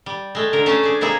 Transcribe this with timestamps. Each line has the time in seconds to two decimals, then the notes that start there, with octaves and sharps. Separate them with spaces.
0.06 G3
0.35 G#3 A3
0.53 D3 A#4
0.66 A3 C#4 C5 A5
0.83 D4 G#4
1.01 C3 A#3 D#4 E4 G#4